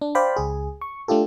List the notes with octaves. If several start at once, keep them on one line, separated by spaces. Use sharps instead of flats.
D4
C5 D5 F5 G5 B5
C#2 G#4
C#6
A3 D4 F4 G4 A4